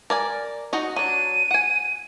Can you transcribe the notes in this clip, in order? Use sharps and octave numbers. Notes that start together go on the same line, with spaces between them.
A#4 D5 G#5
D#4 F#4 D#5
F#3 D4 D#7
F#5 G#5